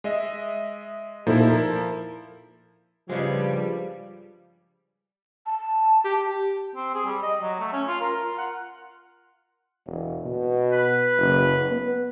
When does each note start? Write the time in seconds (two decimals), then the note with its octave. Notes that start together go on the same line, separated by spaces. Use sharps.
0.04 G#3 D#5 E5
1.27 A#2 F3 D#4 E4 A4
1.49 A#4
3.09 G2 C#3 F3 G3 G#3
5.46 A5
6.05 G4
6.76 C4
6.95 G#4
7.06 G3
7.23 D#5
7.42 F#3
7.60 A3
7.73 C#4
7.88 F4
8.01 A#4
8.25 F4
8.38 F#5
9.87 E1
10.25 B2
10.72 B4
11.18 F#1
11.71 B3